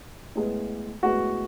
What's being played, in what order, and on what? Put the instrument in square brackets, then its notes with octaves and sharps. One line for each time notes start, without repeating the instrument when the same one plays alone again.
[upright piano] A2 G#3 B3
A2 G#3 B3 F#4